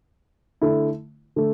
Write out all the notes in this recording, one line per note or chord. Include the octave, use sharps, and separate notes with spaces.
D3 A3 E4
D3 A3